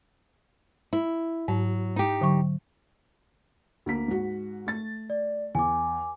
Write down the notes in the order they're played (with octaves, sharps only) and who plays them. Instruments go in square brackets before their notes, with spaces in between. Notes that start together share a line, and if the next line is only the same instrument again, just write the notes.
[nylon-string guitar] E4
[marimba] G#2 [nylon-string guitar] F#3
[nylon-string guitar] D#4 G4
[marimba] D3 F#3 C#6
[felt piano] D2 A#3 B6
G#2 F#4
A3 A6
[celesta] D5
[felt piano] E2 [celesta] G#5 D6